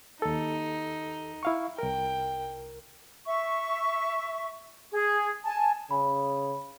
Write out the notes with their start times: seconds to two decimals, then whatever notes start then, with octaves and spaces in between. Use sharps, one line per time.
0.22 D#2 D#4 A4
1.43 E4 F5 C#6
1.78 C2 A#4 G5
3.26 E5 C#6
4.92 G#4
5.45 G#5 A5
5.91 C#3 B5